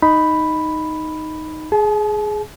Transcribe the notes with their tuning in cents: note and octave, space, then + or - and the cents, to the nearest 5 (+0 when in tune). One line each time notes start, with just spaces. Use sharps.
D#4 +0 B5 +0
G#4 +10 A5 -40